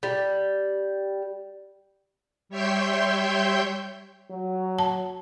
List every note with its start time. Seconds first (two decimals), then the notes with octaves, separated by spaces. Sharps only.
0.03 G3
2.49 G3 C#5 E5 G5 C6 G6
4.30 F#3
4.79 A5